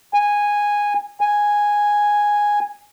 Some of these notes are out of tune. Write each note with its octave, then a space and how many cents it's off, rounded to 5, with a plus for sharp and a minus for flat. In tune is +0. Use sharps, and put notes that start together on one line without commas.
G#5 -10
G#5 -5